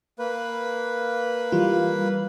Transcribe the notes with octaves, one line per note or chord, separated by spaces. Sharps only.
A#3 B4
E3 G3 F4